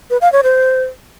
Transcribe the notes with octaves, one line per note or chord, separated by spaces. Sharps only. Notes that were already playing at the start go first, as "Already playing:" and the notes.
B4
F5
C#5
C5